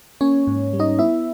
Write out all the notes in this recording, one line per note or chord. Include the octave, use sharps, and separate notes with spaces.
A#3 C#4 C#5
G#2
G3
D#4 D#5
B3 E4 E5